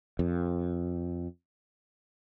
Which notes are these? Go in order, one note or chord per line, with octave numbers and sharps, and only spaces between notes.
F2